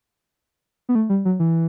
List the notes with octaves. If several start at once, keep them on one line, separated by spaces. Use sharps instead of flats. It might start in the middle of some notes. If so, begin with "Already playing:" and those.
B3
A3
G3
F#3
E3